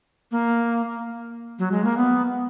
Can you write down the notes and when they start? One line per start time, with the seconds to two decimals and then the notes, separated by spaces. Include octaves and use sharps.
0.32 A#3
1.59 F#3
1.72 G#3
1.84 A#3
1.97 B3